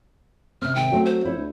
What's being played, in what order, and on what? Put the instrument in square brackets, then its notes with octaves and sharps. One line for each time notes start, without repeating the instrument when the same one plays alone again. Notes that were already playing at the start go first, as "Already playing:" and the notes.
[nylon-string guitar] C3 C4 [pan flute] F6
[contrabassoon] G#1 [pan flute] G5
[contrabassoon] F#3 [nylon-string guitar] A3 C4
[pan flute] C5
[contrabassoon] F2 [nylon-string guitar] E4 C#5
[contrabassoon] D2